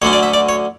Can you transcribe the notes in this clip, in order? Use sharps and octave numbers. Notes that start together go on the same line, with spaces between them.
D2 D3 F#3 C#4 C#5
D5
E5
D5
C#5